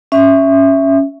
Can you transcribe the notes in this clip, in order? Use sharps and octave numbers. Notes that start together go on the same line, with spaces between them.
C#4 E5